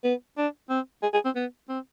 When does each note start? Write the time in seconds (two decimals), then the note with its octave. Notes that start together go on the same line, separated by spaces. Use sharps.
0.04 B3
0.37 D4
0.70 C4
1.03 G#4
1.13 G#4
1.25 C4
1.36 B3
1.69 C4